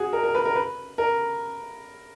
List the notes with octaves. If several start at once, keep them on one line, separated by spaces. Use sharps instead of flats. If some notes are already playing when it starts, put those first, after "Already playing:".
Already playing: F#4 G#4
A#4
A#4
B4
A#4
B4
A#4